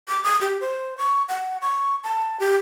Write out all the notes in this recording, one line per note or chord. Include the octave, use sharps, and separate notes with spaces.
D6
D#6
G4
C5
C#6
F#5
C#6
A5
G4